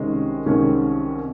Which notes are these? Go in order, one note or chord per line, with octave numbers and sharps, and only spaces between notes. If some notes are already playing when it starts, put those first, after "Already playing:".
Already playing: C2 C3 D#3 G#3 C#4
C2 C3 D#3 G#3 C#4